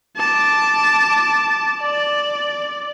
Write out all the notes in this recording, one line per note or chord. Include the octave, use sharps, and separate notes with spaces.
A5 D6
D5